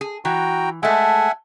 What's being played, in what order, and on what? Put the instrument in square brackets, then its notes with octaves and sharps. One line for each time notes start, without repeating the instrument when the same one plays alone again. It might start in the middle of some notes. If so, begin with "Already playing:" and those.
[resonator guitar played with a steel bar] G#4
[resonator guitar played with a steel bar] E3 [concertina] F#4 G5 A#5
[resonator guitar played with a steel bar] G#3 A3 [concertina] E5 F#5 G#5